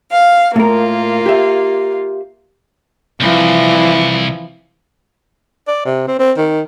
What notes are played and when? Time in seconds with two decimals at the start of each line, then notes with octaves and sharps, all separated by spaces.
0.11 F5
0.56 A2 A#3 F4 A#4
1.26 G4 E5
3.20 C2 E3 F3
5.68 D5
5.85 C3
6.08 C4
6.19 C4
6.37 D#3